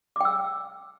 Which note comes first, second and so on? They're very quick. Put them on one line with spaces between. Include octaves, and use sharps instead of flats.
D6 G5 E6